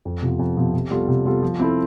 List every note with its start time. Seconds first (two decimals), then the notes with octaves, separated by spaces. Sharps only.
0.05 F2
0.22 C3 F3 B3
0.39 F2
0.57 C3 F3 B3
0.74 C3
0.91 G3 B3 F4 A4
1.08 C3
1.25 G3 B3 F4 A4
1.42 F3
1.59 C4 E4 A4